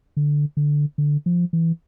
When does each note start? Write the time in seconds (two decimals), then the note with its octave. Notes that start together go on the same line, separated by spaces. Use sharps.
0.17 D3
0.57 D3
0.98 D3
1.26 F3
1.53 E3